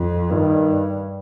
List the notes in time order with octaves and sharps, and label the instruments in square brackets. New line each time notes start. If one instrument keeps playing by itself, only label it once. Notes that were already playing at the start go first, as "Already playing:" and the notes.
Already playing: [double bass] F2
[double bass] G2 [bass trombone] D#3